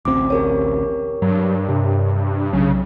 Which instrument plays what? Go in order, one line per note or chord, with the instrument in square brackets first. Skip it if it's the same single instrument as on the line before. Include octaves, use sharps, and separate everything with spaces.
[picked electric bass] A1 D2 C4 [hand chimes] D6
[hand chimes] G4 A#4 C#5
[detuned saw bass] G2 [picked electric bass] F#3
[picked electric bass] C3
[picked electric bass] B1 F#3 [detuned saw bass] C#3